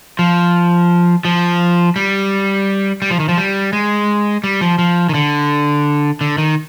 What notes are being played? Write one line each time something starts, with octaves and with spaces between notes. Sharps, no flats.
F3
F3
G3
G3
F3
D#3
F3
G3
G#3
G3
F3
F3
D#3
D3
D3
D#3